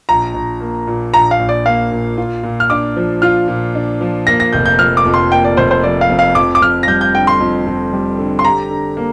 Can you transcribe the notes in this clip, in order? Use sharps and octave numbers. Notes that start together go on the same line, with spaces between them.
A#1 A#5
A#1
A#3
A#2
A#1 A#5
F5
A#1
D5
A#3 F5
A#2
F4
A#2
F6
D4 D6
F3
F4 F6
A#2
D4
F3
A#3 A#6
A#6
F1 G6
G6
F3 F6
D6
F2
C6
A#3 G5
D5
F1 C5
C5
F3 D5
F5
F2
F5
F2 D6
D6
F2 F6
A#6
G3 G6
G6
D3 G5
C6
F2
F2
G3
D3
C6
G4 A#5
D3
A#3